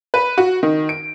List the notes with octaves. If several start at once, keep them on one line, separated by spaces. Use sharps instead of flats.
B4
F#4
D#3
D7